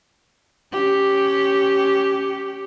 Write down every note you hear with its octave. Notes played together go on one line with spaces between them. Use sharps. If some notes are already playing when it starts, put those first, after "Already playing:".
C#4 G4